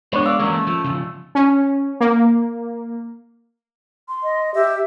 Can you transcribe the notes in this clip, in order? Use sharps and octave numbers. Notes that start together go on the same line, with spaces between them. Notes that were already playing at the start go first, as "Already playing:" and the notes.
G#3 B3 D4 B4 C#5
D5 F5 E6
E3 F#3 G#3 A#3 C#4
A3
F3
C#3 F3
C#4
A#3
C6
D#5
G4 E5